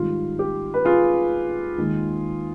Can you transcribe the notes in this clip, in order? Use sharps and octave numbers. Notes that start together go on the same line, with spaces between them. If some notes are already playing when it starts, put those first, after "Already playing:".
Already playing: G#2 D#3 G3 F4
G4
B4
F4 G#4
D#2 D#3 G#3